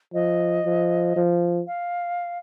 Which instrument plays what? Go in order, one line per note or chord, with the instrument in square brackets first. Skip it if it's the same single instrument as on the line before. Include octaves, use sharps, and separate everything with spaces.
[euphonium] F3 [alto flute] D#5
[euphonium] F3
F3
[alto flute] F5